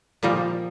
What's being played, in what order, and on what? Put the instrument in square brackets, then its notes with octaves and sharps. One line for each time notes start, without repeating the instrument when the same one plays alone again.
[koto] A#2 G3 A#3 D#4 [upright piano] F3